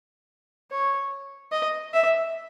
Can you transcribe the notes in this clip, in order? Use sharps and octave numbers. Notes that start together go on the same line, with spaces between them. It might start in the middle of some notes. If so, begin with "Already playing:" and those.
C#5
D#5
E5